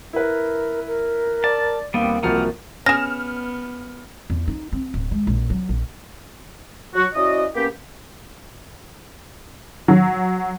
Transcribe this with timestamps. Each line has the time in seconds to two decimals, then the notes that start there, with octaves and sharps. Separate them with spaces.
0.13 E4 A#4 B4
0.87 A#4
1.44 D5 A5
1.94 D#2 G3 B3 C4 F5
2.23 C2 E3 F3 A#3 F#4 F#5 F6
2.86 B3 C#4 G#4 F6 A#6 E7
4.30 E2
4.48 D#4
4.73 C4
4.94 D1
5.11 G#3
5.27 A#1
5.50 F#3
5.69 A#1
6.95 F#3 F#4
7.14 C#4 E4 F#4 D5 D#5
7.55 A#3 B3 C#4 G4
9.88 F#3